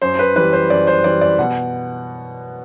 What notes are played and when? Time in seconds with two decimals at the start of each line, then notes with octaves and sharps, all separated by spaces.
0.02 F#2 C5
0.19 B4
0.36 E3 G3 B4
0.53 C5
0.70 F#2 D5
0.87 C5
1.04 E3 G3 D5
1.21 D5
1.39 B2 F#5